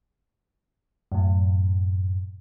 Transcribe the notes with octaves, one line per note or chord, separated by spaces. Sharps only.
F#2 A2